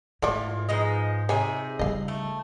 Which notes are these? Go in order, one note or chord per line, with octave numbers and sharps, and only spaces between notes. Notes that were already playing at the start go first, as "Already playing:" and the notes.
G#2 E3 A3 F4 C#5 D5
F3 G#3 D#4 B4 D#5
C3 D#4 G#4 C#5 E5 G#5
C#3 G3 D#5 F5
A3